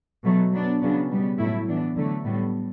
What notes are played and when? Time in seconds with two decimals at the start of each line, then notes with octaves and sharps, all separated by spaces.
0.24 B2 F#3 A3
0.52 F#3 B3 D4
0.81 C#3 F#3 B3 D4
1.10 B2 G3 B3
1.39 A2 F#3 A3 E4
1.67 E3 B3 D4
1.96 D3 F#3 A3
2.24 A2 G3 B3